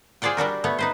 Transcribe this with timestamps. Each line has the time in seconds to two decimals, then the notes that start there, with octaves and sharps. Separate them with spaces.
0.22 F4 G#4 C5 D5 F#5 G5
0.37 G3 D4 F#4 A#4
0.64 A3 B3 C#5 F#5
0.79 D#4 B4 C5